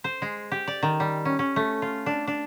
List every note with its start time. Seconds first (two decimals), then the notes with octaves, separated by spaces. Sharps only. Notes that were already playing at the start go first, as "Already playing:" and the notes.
0.04 C5
0.22 G#3
0.52 G4
0.67 D5
0.83 D#3
1.00 G3
1.25 C#4
1.39 C#4
1.56 A3
1.82 F4
2.06 D4
2.27 D4